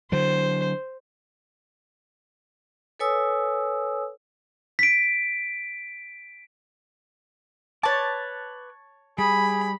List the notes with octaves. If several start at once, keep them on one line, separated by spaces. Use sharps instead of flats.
D3 F#3 C5
A4 B4 C#5 G#5 D#6 E6
B6 D7
B4 C#5 A5 D6
G3 G#4 B5 D#6